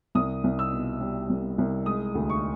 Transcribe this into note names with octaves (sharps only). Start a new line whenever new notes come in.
C2 D#6
C2
E6
B2
G3
C2
C2
G#3 D#6
D2
C#6